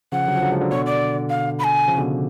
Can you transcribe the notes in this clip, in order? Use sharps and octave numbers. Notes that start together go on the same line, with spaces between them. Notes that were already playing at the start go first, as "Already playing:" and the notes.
C#3 F3 F#5
D3 F#3
F3
D3 F#3
F3 G#3
D3 F#3
B2 D3 C#5
D5
F5
B5
G#5
C#3 F3
B2 D3